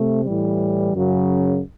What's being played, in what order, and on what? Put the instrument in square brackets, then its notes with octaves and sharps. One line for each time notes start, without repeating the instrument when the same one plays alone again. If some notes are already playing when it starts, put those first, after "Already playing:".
Already playing: [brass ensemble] C3 A3
A2 E3 G3
F#2 C#3 F#3